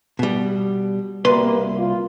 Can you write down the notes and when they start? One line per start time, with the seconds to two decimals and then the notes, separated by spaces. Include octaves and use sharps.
0.19 B2 G3
1.25 C2 B2 G3 A#3 B4 C6
1.77 F4